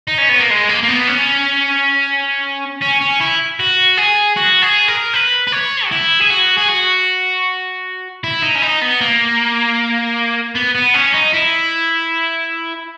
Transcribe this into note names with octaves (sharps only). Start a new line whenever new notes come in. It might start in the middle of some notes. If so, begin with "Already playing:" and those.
D#4
C#4
B3
A#3
G#3
A#3
A#3
B3
C#4
C#4
C#4
E4
F#4
G#4
F#4
G#4
A#4
B4
B4
C#5
F#4
E4
G#4
F#4
G#4
F#4
E4
D#4
C#4
D#4
B3
A#3
B3
B3
C#4
D#4
E4